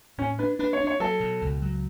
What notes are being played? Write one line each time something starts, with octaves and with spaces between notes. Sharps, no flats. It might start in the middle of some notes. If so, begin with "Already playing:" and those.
A2 C#4
D4 B4
D4 B4
C#5
D4
C#5
F#3 A4
B2
C#2
F#3